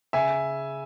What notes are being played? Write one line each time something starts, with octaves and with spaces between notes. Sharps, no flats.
C#3 E5 G#5